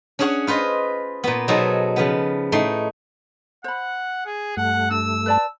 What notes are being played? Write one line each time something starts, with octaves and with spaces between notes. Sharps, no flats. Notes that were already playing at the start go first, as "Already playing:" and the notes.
C#4 D4 G#4 C#5 F#5
F4 B4 C5 D#5
A#2 B3
B2 F#3 D#4 G#4 A4 C5
C#3 F3 B3
A2 A3 D#4 C6
C5 F#5 B5
G#4
G2 A3 F#5
D4 E6
B4 D5 A5